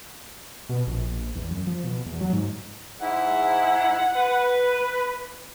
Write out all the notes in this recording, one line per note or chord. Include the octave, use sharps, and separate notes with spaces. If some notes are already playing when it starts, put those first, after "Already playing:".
B2
A#1
E2
F#2
F3
B2
E2
F#3
G#2
G#2 E4 F#5
B4